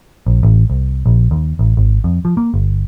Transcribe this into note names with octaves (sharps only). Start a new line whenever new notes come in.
A#1
A1
C2
A#1
D#2
A1
G#1
F2
F3
A#3
G1